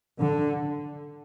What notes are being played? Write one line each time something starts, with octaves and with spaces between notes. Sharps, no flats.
D3